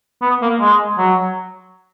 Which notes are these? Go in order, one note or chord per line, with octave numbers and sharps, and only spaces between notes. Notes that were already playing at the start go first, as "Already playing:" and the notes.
B3
A#3
G#3
F#3